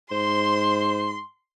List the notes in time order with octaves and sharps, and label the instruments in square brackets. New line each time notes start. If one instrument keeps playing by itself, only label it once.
[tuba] G#2 [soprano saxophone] C5 [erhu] C6